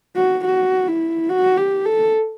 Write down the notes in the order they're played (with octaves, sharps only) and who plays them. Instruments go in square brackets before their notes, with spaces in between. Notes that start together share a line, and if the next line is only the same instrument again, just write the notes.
[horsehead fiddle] F#4
F#4
E4
F#4
G4
A4